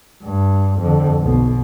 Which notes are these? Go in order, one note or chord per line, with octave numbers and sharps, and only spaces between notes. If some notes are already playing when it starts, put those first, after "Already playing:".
G2
F2 D3
B1 B2